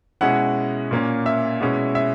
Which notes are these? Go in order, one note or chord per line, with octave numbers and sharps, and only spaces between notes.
B2 G#3 C#4 E4 F#5
A#2 A#3 C#4
E5
B2 G#3 C#4 E4
E5